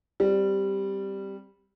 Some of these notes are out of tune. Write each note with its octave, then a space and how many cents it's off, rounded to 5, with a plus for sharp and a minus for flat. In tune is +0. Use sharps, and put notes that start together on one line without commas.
G3 +0 C4 +0 D5 +5